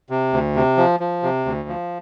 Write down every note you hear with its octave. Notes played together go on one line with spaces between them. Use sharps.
C3
D2
C3
F3
F3
C3
D2
F3